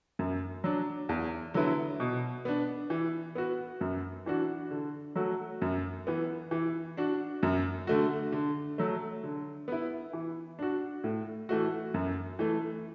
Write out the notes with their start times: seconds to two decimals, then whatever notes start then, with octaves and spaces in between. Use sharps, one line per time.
0.19 F#2
0.64 F#3 D4
1.09 E2
1.54 D3 F#3 B3 E4
2.00 B2
2.45 B3 D4
2.90 E3
3.35 B3 F#4
3.81 F#2
4.26 E3 D4 F#4
4.71 D3
5.16 F#3 A3 F#4
5.62 F#2
6.07 E3 B3
6.51 E3
6.97 D4 F#4
7.43 F#2
7.87 D3 A3 F#4
8.32 D3
8.78 F#3 A3
9.23 D3
9.68 B3 E4
10.13 E3
10.59 D4 F#4
11.04 A2
11.49 E3 A3 F#4
11.94 F#2
12.39 E3 A3